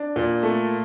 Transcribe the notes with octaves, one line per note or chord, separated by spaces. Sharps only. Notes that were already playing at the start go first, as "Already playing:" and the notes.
Already playing: D4
A#2
A3